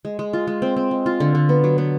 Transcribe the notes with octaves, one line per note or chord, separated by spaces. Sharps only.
G#3
G#3
F4
G#3
C4
C4
G#3
F4
D3
D3
B3
F#3
B3